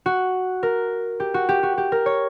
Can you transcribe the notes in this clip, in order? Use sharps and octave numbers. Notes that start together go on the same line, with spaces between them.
F#4
A#4
G4
F#4
G4
F#4
G4
A#4
C#5